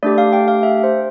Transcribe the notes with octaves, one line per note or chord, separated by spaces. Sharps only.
A3 D4 G4 D5
F5
G5
F5
E5
C5